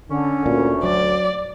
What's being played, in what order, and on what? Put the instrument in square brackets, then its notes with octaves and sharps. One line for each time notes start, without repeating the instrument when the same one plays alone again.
[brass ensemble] D3 [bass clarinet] C#4
[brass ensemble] D2 [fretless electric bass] A#2
[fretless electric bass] F#3 [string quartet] D5